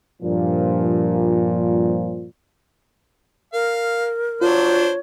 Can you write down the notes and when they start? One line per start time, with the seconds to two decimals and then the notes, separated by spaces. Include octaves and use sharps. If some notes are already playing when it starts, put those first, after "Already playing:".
0.23 G2 A#2 F3
3.53 A#4 F5
4.41 F#3 D4 F4 C5 C#5